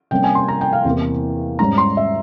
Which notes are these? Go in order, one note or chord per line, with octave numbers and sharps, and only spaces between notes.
C3 G3 A#3 C#4 G5
G#5
C6
A#5
G5
F5
E2 C3 E3 A#3
G#2 G3 C#4 A#5
C6
E5